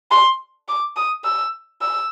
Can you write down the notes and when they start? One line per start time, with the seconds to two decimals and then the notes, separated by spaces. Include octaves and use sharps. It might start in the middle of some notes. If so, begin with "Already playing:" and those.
0.11 C6
0.68 D6
0.97 D#6
1.25 E6
1.82 E6